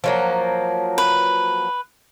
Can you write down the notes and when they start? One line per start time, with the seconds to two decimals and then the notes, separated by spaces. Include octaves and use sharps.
0.04 F3 F#3 A#3
0.98 B4